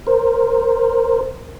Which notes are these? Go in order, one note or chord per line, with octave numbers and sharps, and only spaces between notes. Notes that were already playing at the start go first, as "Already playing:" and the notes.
A#4 C5